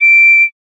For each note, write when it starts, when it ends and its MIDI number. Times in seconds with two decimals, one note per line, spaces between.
0.01 0.44 98